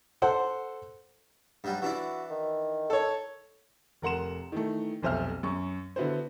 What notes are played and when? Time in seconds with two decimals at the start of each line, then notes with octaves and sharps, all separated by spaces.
0.22 A4 C5 F#5
1.64 G2 F#3 G3
1.82 E3 D4 E4 F#4
2.31 D#3
2.90 A4 C#5
4.02 F1 A#4 F#5 C6 E7
4.52 D#3 E3 A3
5.02 F1 B1 C5 E5 F6
5.43 F#2 C#6
5.96 D3 B3 E4 F#4 B4 C5